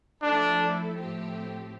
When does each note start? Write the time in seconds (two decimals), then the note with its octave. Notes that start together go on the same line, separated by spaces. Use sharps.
0.22 F3 A3 D4 E4 A4
0.96 A2 F3 A3 C4 G4